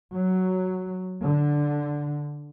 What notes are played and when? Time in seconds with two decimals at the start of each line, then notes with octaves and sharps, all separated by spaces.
0.14 F#3
1.24 D3